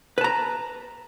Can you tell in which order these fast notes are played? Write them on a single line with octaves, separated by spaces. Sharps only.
B4 A5 A#5